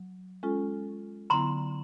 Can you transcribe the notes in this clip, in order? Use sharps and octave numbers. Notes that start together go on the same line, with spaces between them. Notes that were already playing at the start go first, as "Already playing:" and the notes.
Already playing: F#3
G#3 C#4 F4 A4
D3 F#3 B3 E4 A#5 C6